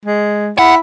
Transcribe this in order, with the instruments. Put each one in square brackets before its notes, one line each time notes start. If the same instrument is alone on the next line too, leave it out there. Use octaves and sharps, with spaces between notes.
[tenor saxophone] G#3
[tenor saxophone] E4 [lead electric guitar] F#5